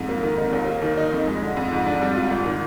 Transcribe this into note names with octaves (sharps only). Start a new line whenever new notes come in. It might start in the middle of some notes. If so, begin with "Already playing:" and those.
Already playing: F2 G#2
A#3
D#3
D#4
D#2
A#3
D#3
D#4
F2
G#3
D3
F2
G#2
D4
G3
F4
G#1
D#3